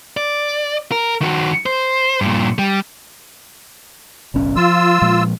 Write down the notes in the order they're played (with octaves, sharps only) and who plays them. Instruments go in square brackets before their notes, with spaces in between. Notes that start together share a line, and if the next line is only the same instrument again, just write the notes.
[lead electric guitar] D5
A#4
D#3 F#4
C5
G2 A#2
G3
[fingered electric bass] F#1 B1 C#4
[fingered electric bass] F3 [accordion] F4 E6
[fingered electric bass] A#2 F3 G#3